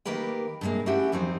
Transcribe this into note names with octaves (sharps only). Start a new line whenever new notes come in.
D#3 A#3 G4 A#4 B4 G5
G2 C3 E3 G#3 A#3
A3 C#4 E4 F#4 G4 F#5
F2 D#3 F3 F#3 C4